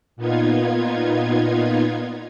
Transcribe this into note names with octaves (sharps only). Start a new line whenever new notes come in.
A#2 B3 D#4 F4 G#6